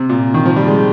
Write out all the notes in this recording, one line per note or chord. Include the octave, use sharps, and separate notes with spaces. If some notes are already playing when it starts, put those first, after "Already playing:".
Already playing: C3
A#2
D#3
F3
G3
G#3